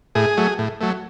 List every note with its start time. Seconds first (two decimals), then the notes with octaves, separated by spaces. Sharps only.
0.15 A2 G#4
0.37 F#3 A3
0.58 A2
0.81 F#3 A3